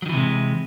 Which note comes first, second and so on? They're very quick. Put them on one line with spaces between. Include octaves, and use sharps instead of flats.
F#3 D#3 E3 C3 G#3